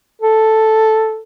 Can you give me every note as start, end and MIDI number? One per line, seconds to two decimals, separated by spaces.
0.22 1.20 69